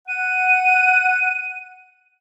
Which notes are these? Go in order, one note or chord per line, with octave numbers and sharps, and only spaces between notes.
F#5 D#7